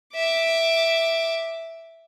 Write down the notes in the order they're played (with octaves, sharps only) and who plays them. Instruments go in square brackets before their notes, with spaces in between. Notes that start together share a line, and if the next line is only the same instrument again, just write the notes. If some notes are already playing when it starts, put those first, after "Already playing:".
[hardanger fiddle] E5 D6